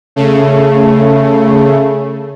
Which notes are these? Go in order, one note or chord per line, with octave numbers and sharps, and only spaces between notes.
C#3 A3